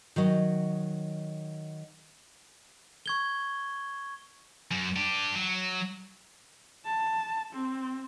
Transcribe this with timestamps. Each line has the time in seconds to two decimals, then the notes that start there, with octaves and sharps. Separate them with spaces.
0.16 D#3 F#3 D#5
3.06 C#6 G#6 G7
4.71 F#2
4.96 D4 G4
5.35 F#3
6.85 A5
7.53 C4